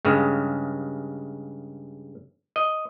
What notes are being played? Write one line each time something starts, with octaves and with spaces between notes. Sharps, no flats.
G2 C#3 G#3
D#5